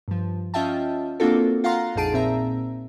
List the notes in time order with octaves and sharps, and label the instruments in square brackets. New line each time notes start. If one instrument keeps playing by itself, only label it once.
[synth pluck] G2 F3
C#4 F4 D#5 E5 G5 A5
A#3 C4 D4 F4 F#4 A4
F4 F5 F#5 A#5 C6
A#1 F2 D#4 G#4 A5 D7
A#2 C4 E5 A#5